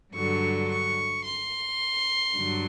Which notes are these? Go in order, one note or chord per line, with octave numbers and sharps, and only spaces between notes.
G2 D3 F#3 C#6
C#6
C6
G2 D3 F#3